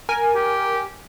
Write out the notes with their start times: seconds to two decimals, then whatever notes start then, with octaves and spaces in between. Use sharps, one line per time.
0.09 A#4 G#5
0.35 G4